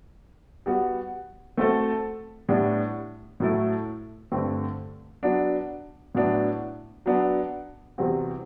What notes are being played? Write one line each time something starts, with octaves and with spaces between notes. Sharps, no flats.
G3 B3 F#4
A3 C4 F#4 A4
A2 G3 B3 D4
A2 F#3 A3 E4 A4
G2 D3 A3 C4 G4
F#3 B3 D4
A2 F#3 B3 D4
F#3 B3 D4
E2 C3 G3 C4 F#4